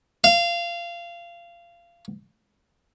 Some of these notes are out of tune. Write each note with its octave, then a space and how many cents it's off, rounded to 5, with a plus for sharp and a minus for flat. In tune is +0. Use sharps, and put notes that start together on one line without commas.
F5 -20